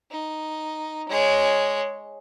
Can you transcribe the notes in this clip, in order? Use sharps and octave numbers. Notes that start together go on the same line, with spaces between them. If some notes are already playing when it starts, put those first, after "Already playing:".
D#4
G#3 C#5